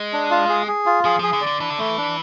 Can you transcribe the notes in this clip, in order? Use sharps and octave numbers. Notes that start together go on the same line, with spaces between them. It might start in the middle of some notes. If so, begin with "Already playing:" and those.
Already playing: G#3
D4
F4
G#4
G#4
F4
F3 G#4
F3 G#4
D3
D5
D3
E3 D4
D3
E3 A3
D4